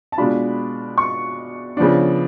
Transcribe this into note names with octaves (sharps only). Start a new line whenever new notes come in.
A5
B2 G#3 D4 F4 B5
C#6
C#3 F3 B3 D4